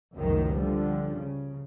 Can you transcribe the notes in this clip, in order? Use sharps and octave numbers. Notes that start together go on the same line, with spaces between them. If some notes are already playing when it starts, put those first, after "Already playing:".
F1 C#2 F#2 A2 D#3
D3 F3 G3
C#3